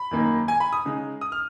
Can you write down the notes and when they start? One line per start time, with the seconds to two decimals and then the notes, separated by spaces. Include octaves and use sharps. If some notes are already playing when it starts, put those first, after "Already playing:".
Already playing: B5
0.11 F#2 D#3 A#3 D#4
0.48 G#5
0.60 B5
0.73 D#6
0.85 C#3 G#3 D#4
1.21 D#6
1.32 F6